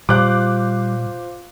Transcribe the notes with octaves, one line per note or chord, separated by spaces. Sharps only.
A#2 G3 F4 C5 F5 D6 F#6